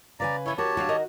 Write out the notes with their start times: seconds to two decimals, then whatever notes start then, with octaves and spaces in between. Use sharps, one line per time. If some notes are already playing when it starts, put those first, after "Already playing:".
0.20 C#3 B4 D5 G#5 A#5
0.46 E3 B3 C#4 E4 C#5
0.58 F#4 G4 A#4 C#5 A5
0.77 D2 F#3 F#4 F5 F#5
0.88 D#3 A#4 D#5